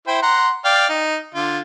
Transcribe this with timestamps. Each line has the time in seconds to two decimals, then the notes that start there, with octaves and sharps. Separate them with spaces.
0.07 E4 C5 G5
0.22 F#5 A#5 C6
0.65 D5 F5 G5
0.89 D#4
1.35 D3 F4